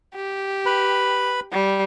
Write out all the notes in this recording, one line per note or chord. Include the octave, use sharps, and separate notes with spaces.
G4
B4 B5
G3